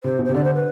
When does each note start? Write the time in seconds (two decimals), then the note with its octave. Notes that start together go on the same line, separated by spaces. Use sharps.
0.04 C3 C5
0.19 B2
0.25 C3 C5
0.34 D3 D5
0.44 C5
0.55 B4